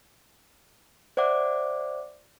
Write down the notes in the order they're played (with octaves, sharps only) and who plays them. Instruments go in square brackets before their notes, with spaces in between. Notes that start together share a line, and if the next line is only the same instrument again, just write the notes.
[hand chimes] C5 D5 E5 F#5 D6